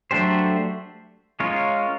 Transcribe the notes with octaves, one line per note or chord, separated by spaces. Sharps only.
F#3 A3 D4 G4 C5
G#3 C#4 F4 A#4 C#5